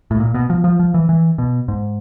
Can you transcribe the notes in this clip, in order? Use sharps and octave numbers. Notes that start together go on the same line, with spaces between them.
A2
A#2
B2
F3
F3
F3
E3
E3
B2
G#2